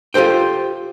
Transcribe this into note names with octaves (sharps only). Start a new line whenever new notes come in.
F4 G4 A4 C5 G5